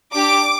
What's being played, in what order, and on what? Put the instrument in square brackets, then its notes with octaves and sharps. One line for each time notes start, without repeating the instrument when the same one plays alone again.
[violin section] D4 G4 D6